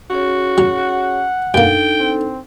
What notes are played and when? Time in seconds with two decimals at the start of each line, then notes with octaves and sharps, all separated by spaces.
0.10 C#4 F#4 G#4 C#5
0.58 F#3 F#5
1.54 F#2 A#3 D4 D#4 A4 G5
1.99 C4